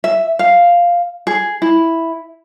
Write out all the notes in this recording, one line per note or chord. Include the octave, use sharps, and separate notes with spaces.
E5
F5
G#4
E4